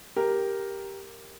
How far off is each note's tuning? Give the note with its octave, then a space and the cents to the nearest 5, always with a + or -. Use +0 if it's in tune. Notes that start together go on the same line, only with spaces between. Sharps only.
G4 +0 A#4 +0